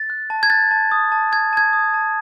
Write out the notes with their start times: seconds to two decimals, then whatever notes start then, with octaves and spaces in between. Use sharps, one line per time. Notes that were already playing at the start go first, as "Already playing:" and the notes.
Already playing: A6
0.10 F#6
0.30 A5
0.43 G#6
0.50 F#6 A6
0.71 A5
0.92 D#6
1.12 A5
1.32 A5 G#6
1.53 A5 G#6
1.73 D#6
1.94 A5